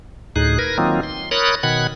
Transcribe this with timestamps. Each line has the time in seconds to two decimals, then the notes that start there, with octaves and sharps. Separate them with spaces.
0.36 D2 A2 D#4 G#4 F#6
0.59 A#4 B4 G#6 A#6
0.78 D#3 F#3 A#3 C4 D#4 F4
1.03 C6
1.31 A#4 C#5 B5 D#6 F#6 A6
1.63 B2 D#3 F#5 B5 F#6 G#6